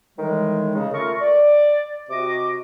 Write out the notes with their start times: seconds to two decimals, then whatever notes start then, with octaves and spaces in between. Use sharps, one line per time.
0.19 A2 D#3 E3 G3 G#3
0.76 C#3
0.93 A3 F4 A#4 C#6
1.21 D5
2.10 C3 F#4 D#5 D6